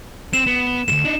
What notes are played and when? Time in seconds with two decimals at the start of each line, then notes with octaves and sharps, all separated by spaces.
0.33 C4 E7
0.47 B3
0.88 D2 G#2 E7
1.05 D4 D#4